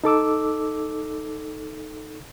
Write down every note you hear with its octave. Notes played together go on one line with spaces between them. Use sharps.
D#4 A4 D6 E6